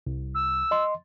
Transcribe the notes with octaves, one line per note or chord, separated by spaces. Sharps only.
C2
E6
D#5 C6